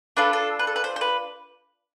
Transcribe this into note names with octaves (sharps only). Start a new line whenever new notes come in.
D4 F4 A4 B4
A4
B4
A4
B4
C5
C5
B4